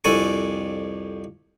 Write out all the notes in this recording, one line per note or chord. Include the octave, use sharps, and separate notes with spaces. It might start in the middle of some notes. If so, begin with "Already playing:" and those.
C2 F2 D4 A4 G#5 C#6